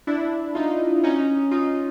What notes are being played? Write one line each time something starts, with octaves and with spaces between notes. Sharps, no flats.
D4 E4
D#4 F4
C#4 D#4
D#4 F4